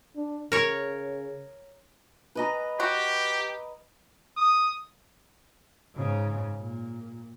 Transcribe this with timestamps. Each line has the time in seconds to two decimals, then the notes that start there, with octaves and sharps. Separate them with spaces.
0.16 D4
0.52 C#3 A#4 C#5
2.35 B4 D#5 A#5
2.80 F#4 G4
4.38 D#6
5.95 G#2 C#3
6.59 A#2